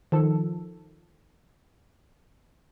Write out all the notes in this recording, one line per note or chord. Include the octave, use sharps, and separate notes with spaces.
D#3 F3 A4